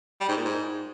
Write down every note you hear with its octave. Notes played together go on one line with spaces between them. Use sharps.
G3
G#2
A#2
G#2